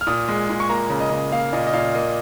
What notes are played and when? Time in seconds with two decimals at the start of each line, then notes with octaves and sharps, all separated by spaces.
0.01 F6
0.07 A#2 D#6
0.28 G#3
0.49 A#2
0.60 C#6
0.69 A#3 A#5
0.90 C#3
1.00 D#5
1.11 C#3
1.32 A#3 F5
1.52 A#2 D#5
1.67 D#5
1.73 A#2 F5
1.95 A#3 D#5